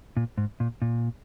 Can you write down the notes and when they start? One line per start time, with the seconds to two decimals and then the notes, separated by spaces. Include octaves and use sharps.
0.17 A#2
0.38 G#2
0.60 A#2
0.82 A#2